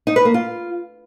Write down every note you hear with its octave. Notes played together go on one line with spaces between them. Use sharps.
D#4
B4
A#3
F4